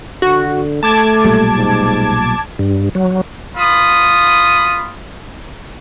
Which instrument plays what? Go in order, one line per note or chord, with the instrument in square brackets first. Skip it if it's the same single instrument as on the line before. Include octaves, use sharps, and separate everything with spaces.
[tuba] D3 [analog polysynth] F#4
[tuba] A3 [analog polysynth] A5 D6 G#6
[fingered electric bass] B1 A#2 G3
[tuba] G#2
[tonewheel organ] G2
F#3
[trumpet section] F4 B5 D#6